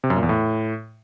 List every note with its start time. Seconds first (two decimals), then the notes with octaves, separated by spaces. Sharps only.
0.04 C3
0.10 F#2
0.16 A#2
0.23 E2
0.29 A2